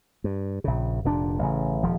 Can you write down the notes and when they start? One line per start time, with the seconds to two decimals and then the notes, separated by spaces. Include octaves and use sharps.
0.24 G2
0.64 A#1 C#3
1.05 F1 A#2 D4
1.39 A1 C#3
1.83 D#1 F3